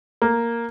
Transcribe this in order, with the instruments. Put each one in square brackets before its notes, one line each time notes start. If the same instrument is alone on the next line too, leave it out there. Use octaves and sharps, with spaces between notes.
[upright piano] A#3